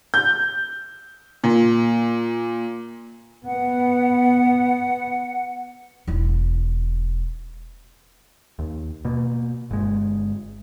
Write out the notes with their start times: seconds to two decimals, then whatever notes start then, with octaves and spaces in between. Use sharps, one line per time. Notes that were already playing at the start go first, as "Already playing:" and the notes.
0.14 G6
1.44 A#2
3.46 B3 F#5
6.07 E1 E4
8.59 D#2
9.05 B2 A#3
9.71 G1 G#3